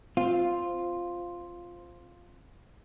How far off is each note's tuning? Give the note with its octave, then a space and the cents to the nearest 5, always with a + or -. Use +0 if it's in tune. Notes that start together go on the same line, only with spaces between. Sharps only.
C4 +0 F4 +0